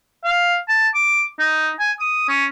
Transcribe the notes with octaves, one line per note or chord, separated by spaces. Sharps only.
F5
A5
D6
D#4
G#5
D#6
C#4